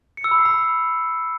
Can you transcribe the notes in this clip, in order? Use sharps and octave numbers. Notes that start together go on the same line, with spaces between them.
C#7
E6
B5
C7
B5